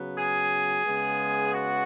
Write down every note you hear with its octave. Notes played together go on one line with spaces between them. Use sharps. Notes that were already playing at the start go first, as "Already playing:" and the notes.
Already playing: C#3 F#3 B3
G#4
C#3 G#3 B3
F#4